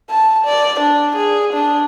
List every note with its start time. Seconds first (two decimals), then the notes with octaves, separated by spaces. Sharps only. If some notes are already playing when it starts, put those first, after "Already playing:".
0.10 A5
0.45 D5
0.80 D4
1.16 G#4
1.53 D4